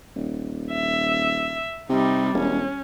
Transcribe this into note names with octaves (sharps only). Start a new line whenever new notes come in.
D#1
E5
C3 G3 D#4
E1 C#4